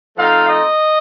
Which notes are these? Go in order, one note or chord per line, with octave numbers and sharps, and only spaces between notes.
F3 A3 C4 D#4 F5
D#5